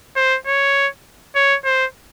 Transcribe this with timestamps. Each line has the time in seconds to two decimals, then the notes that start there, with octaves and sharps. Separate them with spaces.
0.16 C5
0.46 C#5
1.36 C#5
1.65 C5